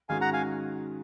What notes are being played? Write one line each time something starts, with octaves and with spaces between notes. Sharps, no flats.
G#2 D#3 G#3 C#4 F#4 F5 G#5
F#5 A#5
F5 G#5